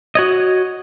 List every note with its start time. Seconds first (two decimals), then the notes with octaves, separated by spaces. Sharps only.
0.15 F#4 C#5 D#5